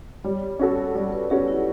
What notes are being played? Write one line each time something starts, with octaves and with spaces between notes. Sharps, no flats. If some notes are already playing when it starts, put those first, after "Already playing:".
G3 C#5
C#4 F#4 A4
G3 D5
B4
C#4 F#4 G4 A4
E4